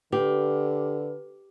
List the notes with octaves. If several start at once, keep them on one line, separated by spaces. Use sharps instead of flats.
D3 G4 B4